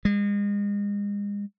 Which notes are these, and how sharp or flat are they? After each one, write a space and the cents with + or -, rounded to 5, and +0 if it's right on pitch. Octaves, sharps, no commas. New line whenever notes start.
G#3 -35